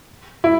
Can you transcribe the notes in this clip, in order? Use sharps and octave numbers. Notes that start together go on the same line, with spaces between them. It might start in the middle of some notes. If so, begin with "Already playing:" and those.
E4